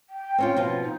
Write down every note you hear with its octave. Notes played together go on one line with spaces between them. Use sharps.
G5
C4 C#4 F4
B2 F3 F4
D#4